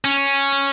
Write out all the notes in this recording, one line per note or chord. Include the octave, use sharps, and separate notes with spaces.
C#4